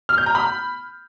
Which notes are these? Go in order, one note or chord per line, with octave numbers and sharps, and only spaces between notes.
F6
G6
A#5
B5